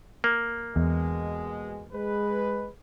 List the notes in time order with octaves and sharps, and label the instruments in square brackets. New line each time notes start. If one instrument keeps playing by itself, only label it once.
[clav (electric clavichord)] A#3
[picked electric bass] E2 [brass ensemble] B2 G#3
[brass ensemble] G#3 B4